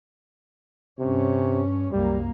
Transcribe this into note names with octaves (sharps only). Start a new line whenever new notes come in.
G2 C3 C#4
C2 F#2 G3 A#3